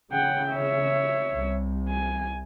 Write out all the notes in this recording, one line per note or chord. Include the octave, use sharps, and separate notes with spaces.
C#3 F#5 G5
C#5 E5
C2
G#5